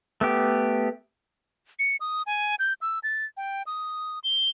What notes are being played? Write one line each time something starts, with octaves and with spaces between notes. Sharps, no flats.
A3 B3 G4
C#7
D#6
G#5
G6
E6
A6
G5
D#6
G7